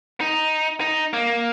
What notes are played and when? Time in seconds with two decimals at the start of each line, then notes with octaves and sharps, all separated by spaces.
0.21 D#4
0.81 D#4
1.13 A#3